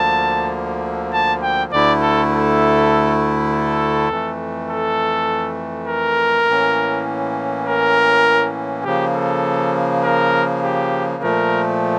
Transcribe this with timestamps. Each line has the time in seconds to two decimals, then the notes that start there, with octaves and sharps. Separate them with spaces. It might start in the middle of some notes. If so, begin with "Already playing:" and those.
Already playing: D2 D3 F3 A#3 A5
1.13 A5
1.43 G5
1.72 D2 D3 A3 E4 D5
2.01 A4
2.32 A4
3.51 A4
4.10 F2 E3 A3
4.69 A4
5.88 A#4
6.48 A2 E3 A#3 C#4
7.66 A#4
8.85 C#3 F3 A#3 G4
9.14 A4
10.04 A#4
10.63 G4
11.22 A#2 F3 A3 A#4